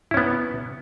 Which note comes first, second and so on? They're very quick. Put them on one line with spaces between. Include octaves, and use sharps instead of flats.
E4 C#4 B3